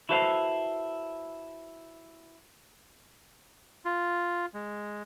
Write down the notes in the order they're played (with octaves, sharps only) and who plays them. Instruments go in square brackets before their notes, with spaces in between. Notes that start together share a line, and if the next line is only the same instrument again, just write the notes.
[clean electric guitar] E4 F#4 A4 B4 C5 F5
[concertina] F4
G#3